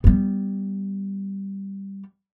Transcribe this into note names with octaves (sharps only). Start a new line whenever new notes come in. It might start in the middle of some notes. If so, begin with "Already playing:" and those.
G3 B3